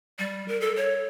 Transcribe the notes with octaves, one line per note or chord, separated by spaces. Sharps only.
G3
A#4
A4
C#5